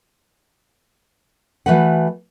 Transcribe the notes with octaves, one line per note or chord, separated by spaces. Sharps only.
E3 A3 F#4 B4 F#5